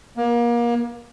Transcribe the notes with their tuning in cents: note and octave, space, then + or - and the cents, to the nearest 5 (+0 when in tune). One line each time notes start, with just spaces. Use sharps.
A#3 +30